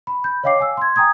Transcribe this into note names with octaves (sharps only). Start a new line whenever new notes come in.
B5
B5 G6
C#5 D#5 F5 G5 D6 C7
F5 G#5 E6
C6 G#6
G5 G#5 A#5 D#6 G#6